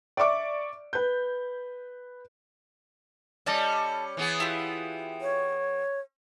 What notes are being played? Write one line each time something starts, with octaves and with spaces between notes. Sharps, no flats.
D5 E5 C#6 D6
B4 G6
G3 C#4 A4 D5 D#5
E3 B3 G#4
E4 F4 G4
C#5